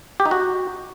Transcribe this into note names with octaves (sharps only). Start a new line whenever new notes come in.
G4
D#4
F#4